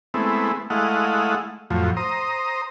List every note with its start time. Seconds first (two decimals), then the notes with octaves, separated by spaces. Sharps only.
0.14 G#3 A3 B3 C4 E4
0.70 G#3 A3 E4 D#5 F5 F#5
1.70 F2 A2 F3 F#3
1.97 C5 A#5 D#6